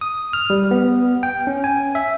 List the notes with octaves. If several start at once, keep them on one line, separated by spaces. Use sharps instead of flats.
D#6
F6
G3
B3
G5
C#4
G#5
E5